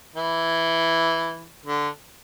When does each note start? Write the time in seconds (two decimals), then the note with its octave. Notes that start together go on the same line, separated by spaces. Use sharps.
0.16 E3
1.66 D3